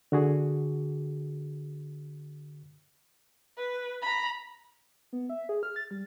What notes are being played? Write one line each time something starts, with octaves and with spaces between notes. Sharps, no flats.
D3 F#4 G#4
B4
A#5 B5
B3
E5
G#4
F6
A6
G3